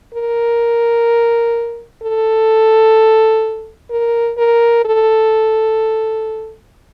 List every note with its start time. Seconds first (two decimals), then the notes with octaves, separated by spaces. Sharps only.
0.15 A#4
2.03 A4
3.90 A#4
4.38 A#4
4.85 A4